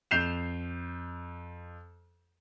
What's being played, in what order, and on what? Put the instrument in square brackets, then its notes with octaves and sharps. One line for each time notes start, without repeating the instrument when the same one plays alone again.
[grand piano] F2 G6 C7 E7 F7